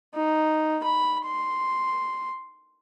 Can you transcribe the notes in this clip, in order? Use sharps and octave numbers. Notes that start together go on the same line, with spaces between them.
D#4
B5
C6